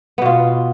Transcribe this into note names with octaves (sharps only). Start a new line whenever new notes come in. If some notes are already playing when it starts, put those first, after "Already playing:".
B2 B3 F4